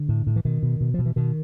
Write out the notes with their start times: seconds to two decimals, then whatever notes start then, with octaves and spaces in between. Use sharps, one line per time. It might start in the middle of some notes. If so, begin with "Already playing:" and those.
Already playing: D3
0.09 A2
0.27 A2
0.36 E3
0.45 B2 D#3
0.63 B2
0.81 B2
0.94 B2 F3
1.06 E3
1.16 B2 D#3